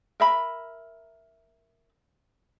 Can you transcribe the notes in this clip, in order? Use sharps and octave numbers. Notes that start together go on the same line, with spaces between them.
A#4 E5 B5